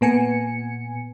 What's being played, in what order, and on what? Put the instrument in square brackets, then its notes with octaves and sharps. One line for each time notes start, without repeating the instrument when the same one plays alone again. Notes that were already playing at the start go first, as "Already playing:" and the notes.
[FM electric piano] A#2 B3 G#5 C#7